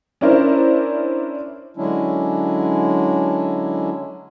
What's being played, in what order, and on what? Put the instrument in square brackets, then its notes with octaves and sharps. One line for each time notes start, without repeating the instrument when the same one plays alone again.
[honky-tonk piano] C#4 D4 E4 A#4 C5
[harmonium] D3 F#3 G#3 C#4 D4 E4